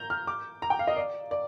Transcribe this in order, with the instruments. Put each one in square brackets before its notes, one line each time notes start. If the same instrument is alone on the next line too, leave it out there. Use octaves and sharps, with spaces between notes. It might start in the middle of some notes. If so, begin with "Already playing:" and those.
Already playing: [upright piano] A#5 G6
F6
D6
A#5
G5
F5
D#5
D5
D5